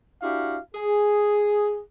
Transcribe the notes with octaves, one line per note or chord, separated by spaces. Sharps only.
D4 E4 F#4 G4 F5
G#4